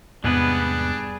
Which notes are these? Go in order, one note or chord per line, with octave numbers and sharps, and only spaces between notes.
E2 G#2 C3 G3 B3 D4 G#4 B4